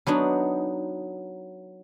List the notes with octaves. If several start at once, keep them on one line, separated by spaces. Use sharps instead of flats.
F#3 B3 D4 D#4